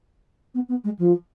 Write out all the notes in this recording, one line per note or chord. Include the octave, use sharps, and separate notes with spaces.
B3
B3
G#3
F3